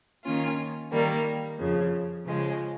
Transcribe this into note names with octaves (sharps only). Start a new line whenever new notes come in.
D#3 A#3 C#4 F4
D#3 G3 A#3
F2 C#3 F3
C#3 F3 G#3